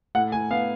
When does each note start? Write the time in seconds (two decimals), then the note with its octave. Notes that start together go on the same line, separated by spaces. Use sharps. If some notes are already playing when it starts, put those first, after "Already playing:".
0.15 A2 F#5
0.32 A2 G#5
0.50 B3 F5